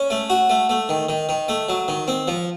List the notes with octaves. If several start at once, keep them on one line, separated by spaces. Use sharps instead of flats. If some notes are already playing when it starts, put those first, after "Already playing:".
Already playing: C#4
A3
F#4
A3
A3
D#3
D#3
D#3
A3
F#3
D#3
C4
F3